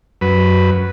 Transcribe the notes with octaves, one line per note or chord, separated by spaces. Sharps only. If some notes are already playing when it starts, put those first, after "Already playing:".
F#2 B4